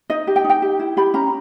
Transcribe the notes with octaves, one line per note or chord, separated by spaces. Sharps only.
D#4 D#5
G4
G5
D#4
G5
G4
E4
G4 B5
C#4 A#5